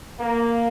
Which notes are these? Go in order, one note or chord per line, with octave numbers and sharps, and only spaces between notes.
A#3